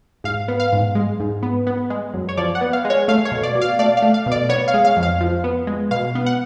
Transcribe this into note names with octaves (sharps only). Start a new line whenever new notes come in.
G#2 F5
B3
F5
G#2
G#3
G#2
B3
B3
G#3
F#2
C#5
F3 D5
F#5
B3
F5
G#3
C#5
A3 F5
C#5
B2
D5
B2
F5
A3 D5
F5
A3
F5
B2
D5
B3 C#5
F5
G#3
F5
F2
F5
F3
B3
G#3
B2 F5
B3
F#5